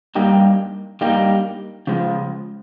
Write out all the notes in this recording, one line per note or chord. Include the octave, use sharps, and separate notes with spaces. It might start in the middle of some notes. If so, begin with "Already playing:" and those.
G2 G3 A#3 D#4 G4
G2 G3 A#3 D#4 G4
C#3 F3 G#3